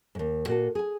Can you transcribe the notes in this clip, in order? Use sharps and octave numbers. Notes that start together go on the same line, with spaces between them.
D#2 G#2
A#2 F#4 A4
G#4 G#5